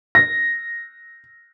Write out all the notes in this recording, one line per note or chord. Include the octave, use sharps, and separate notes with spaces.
A#6